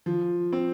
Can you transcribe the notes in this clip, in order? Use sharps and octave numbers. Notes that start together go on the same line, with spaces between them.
F3
C4